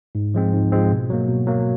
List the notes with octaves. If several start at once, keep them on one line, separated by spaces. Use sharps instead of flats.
G#2
F3 G#3 C4
G#2
F3 G#3 C4
B2
F#3 A#3
B2
F#3 A#3